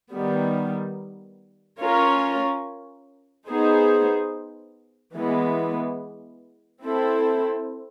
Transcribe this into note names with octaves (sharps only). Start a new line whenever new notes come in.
D#3 G3 B3
C#4 F4 A#4 C#5
B3 D#4 G#4 C5
E3 G#3 B3
C4 E4 A4